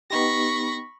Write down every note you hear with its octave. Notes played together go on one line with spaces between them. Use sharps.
B3 D#4 G4 B5 C#6 A#6